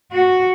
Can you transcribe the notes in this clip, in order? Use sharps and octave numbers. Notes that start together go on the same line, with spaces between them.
F#4